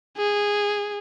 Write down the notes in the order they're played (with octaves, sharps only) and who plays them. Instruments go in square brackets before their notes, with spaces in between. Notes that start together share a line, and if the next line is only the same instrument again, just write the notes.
[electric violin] G#4